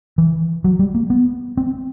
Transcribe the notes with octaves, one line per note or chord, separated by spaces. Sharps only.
E3
F#3
G3
A#3
B3
C4